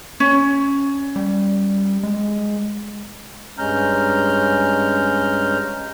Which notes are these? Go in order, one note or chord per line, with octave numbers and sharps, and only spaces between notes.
C#4
G3
G#3
G2 G#3 C#4 A#5 F6 G6